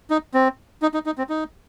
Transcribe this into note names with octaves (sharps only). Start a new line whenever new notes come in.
D#4
C4
D#4
D#4
D#4
C4
D#4